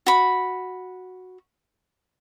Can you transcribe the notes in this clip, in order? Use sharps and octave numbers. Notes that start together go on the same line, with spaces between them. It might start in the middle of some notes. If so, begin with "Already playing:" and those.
F#4 B5